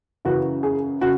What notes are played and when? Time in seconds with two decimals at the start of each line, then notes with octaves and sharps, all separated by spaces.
0.25 F#2 C#3 E3 F#4
0.63 G#4
1.01 C#3 F#4